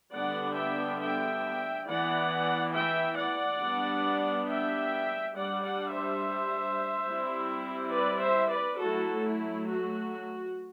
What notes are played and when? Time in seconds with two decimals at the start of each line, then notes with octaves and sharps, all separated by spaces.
0.13 D3 G3 B3 D4 D5 F#5
0.57 E5 G5
1.00 E5 G5
1.87 E3 B3 E4 D5 F#5
2.74 E5 G5
3.17 D5 F#5
3.61 G3 B3 D4
4.48 E5 G5
5.35 G3 D4 D5 F#5
5.64 D5 F#5
5.93 C5 E5
7.09 G3 C4 E4
7.96 B4 D5
8.26 C5 E5
8.54 B4 D5
8.83 F#3 A3 E4 F#4 A4
9.26 E4
9.70 F#4